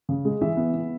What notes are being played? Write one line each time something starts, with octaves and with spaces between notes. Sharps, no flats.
C#3
G#3
E3 E5
B3
B3